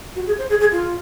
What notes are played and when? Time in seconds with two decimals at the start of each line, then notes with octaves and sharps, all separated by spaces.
0.15 F#4
0.27 G#4
0.38 C5
0.50 G#4
0.60 G#4
0.72 F4